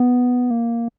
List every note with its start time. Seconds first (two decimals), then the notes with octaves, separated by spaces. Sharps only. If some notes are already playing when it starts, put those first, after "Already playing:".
Already playing: B3
0.51 A#3